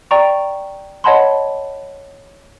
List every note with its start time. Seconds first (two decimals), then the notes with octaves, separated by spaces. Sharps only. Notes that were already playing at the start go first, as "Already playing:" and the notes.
0.11 D5 G5 A#5 C#6
1.04 C#5 D#5 F#5 A5 B5 C6